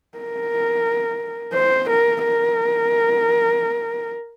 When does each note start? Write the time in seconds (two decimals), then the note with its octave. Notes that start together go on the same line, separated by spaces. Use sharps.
0.18 A#4
1.54 C5
1.90 A#4
2.24 A#4